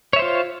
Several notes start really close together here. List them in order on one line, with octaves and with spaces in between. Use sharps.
C#5 E5 C5 F4